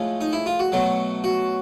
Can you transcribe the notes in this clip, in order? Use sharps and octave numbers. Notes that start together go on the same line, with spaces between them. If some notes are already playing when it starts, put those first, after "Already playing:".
Already playing: A2 F3 G#3
D#4
E4
F4
F#4
B2 F#3 A3
F#4